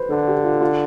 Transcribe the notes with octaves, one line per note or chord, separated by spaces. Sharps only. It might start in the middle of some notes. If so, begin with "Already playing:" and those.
Already playing: B4 C5
D3 A4
G4
F4
F4